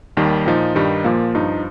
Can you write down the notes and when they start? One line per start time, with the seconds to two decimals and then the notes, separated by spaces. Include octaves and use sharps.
0.17 D#2 D#3 G3
0.46 A#2 F3 D#4
0.75 G2 D#3 G3 D#4
1.04 A#2 F3 A#3
1.35 G2 F3 D#4